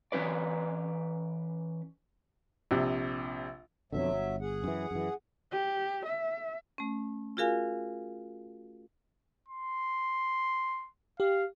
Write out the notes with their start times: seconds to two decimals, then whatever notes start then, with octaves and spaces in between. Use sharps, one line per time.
0.12 E3 G3 C#4 B4 D5
2.71 A#1 C3
3.92 F2 B2 D3 F#3 E5
4.11 G1
4.41 G#4 F#5
4.64 F#2 E3
4.91 F#2 E3
5.52 G4
6.06 E5
6.78 A3 C#4
7.37 F4 F#4 G#4 A#4 F5 G#5
9.49 C6
11.20 G4 F5